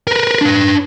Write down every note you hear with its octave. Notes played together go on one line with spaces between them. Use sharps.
A#4 B4
D4 B4